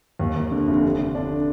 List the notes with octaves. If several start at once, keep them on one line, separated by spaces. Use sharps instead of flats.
D#2
D#2
D3
F1
D3
D3
D4